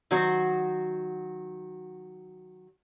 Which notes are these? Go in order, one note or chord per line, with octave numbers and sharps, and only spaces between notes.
D#3 F#3 F#4 C5